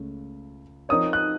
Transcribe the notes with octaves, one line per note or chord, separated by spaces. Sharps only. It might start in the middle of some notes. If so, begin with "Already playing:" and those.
Already playing: C#2 C#3 A3 C#4
F3 C4 D#4 A#4 C#5 D#6
F#6